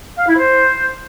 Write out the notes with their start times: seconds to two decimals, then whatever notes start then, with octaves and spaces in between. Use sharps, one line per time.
0.18 F5
0.27 E4
0.36 C5